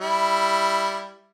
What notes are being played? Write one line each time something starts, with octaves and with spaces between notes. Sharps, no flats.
G3 E4